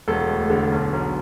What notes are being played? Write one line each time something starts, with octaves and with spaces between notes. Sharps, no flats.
E1 A4
D2
D3
B1
B1